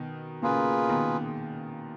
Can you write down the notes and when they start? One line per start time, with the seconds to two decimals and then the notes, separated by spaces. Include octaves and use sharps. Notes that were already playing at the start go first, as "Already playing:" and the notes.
Already playing: B2 D#3
0.42 A#2 C#3 A#3 F4 G#4 B4
0.89 B2 D#3